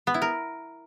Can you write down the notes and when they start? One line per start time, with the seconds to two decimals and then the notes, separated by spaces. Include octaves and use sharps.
0.07 B3
0.14 E4
0.22 A#4